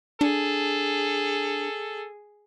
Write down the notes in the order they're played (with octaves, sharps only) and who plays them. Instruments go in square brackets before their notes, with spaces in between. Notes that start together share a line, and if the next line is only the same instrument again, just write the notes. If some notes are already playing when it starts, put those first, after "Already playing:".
[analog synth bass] D4 [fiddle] G#4 [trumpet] A4